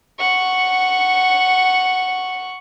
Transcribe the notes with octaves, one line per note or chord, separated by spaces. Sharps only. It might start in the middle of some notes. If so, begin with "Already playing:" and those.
F#5 C#6